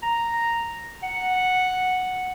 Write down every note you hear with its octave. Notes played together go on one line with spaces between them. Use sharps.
A#5
F#5